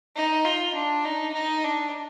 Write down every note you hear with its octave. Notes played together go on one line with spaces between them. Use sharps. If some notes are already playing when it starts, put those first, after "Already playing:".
D#4
F4
D4
D#4
D#4
D4